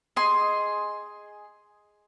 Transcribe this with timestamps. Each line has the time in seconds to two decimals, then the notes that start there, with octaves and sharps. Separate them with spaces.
0.16 G#4 D#5 C6